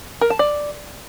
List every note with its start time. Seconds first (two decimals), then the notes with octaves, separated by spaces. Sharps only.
0.21 A#4
0.30 A5
0.39 D5